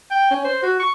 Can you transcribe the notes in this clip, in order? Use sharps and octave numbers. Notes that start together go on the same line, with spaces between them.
G5
C#4
C5
F#4
C#6